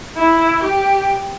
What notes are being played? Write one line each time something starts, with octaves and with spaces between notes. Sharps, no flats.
E4
G4